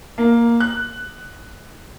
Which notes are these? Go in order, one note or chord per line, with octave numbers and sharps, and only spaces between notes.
A#3
F#6